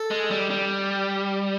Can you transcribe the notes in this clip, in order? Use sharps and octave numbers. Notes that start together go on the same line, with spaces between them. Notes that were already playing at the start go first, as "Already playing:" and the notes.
Already playing: A4
G#3
G3
G3